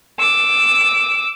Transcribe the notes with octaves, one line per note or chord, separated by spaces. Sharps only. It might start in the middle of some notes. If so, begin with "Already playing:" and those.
D6 E6